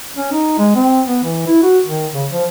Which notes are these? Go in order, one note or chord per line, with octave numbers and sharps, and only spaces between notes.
C#4
D#4
G#3
C4
B3
E3
E4
F#4
D#3
C#3
F3